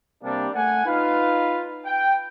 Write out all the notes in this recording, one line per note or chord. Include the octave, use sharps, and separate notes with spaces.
C3 G3 A#3 D4
A3 F#5 G#5
D#4 F4 B4 F5
G5